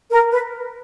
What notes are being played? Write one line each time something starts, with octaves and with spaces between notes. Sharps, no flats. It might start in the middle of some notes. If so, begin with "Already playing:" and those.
A#4
B4